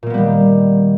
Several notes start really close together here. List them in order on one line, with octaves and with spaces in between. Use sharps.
A#2 A#3 B3 G3 D#3